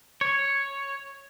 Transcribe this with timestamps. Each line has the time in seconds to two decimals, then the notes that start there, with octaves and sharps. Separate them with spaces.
0.21 C#5